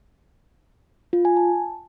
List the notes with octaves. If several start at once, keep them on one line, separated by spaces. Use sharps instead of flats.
F4
G#5
A5